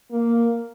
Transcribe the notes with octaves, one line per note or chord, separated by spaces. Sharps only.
A#3